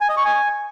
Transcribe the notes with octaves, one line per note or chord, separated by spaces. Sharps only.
G#5
D#5
C#6
G#5